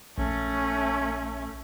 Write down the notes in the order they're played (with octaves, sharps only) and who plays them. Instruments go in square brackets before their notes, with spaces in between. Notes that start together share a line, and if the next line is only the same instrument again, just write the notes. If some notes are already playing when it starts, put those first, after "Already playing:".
[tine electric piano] A#1 [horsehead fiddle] A3 C#4